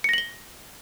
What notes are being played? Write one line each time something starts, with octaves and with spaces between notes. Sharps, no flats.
A#6 C#7 F#7 G7